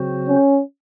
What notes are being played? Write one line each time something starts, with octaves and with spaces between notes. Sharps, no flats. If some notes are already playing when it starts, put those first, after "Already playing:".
Already playing: C#3 F#3 C4 F#4 C5
C#4